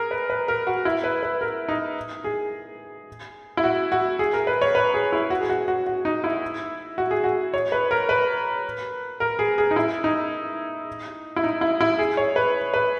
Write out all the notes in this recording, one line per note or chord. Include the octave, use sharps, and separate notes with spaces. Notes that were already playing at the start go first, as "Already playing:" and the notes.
Already playing: G#4 A#4
B4
B4
A#4
F#4
E4
B4
B4
A#4
D#4
G#4
E4
F#4
F#4
G#4
A#4
B4
C#5
B4
G#4
E4
F#4
G#4
F#4
F#4
F#4
D#4
E4
F#4
G#4
F#4
C#5
B4
A#4
B4
A#4
G#4
G#4
D#4
E4
D#4
E4
D#4
E4
E4
G#4
C#5
B4
B4